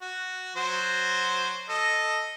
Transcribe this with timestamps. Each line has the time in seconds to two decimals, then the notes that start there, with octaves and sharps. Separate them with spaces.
0.02 F#4
0.56 F#3 F#4 C5
1.69 A4 D#5